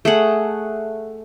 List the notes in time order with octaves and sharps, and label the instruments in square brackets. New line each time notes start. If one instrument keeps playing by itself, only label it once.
[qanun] A3 G#4 F#5